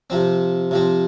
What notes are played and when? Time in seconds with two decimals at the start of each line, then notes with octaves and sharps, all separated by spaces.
0.10 C3 F3 C4
0.71 C3 F3 C4